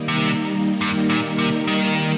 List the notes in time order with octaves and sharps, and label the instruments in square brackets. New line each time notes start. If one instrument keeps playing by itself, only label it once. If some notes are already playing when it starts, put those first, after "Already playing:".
Already playing: [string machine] D#3 G3 A#3 D#4
[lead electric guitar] C3
G2
A#2
C3
D#3